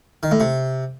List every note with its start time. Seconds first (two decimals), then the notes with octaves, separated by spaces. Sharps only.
0.23 D#3
0.31 A2
0.40 C3